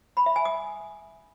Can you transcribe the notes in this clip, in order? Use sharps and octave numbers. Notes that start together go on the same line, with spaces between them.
B5
E5
G#5
D#6